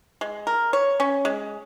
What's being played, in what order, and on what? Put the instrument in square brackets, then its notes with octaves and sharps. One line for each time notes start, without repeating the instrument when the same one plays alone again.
[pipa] G#3
A#4
C#5
C#4
G#3